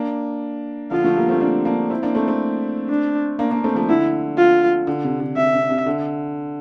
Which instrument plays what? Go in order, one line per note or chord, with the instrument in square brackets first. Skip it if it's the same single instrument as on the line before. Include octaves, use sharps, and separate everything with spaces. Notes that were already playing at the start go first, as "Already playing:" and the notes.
Already playing: [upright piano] A#3 D4
[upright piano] D3 F3 [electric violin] F4
[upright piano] F3 A3
G3 A#3
A3 C4
A#3 D4
A#3 D4
C4 E4
A#3 D4
A3 C4
A3 C4
[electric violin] D4
[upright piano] A#3 D4
A#3 D4
A3 C4
F3 A3
[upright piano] D3 [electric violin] E4
[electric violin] F4
[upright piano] D3
C3
D3
[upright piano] C3 [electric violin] E5
[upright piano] C3
C3
D3